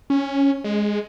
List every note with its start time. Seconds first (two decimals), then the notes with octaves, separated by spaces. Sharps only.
0.10 C#4
0.64 G#3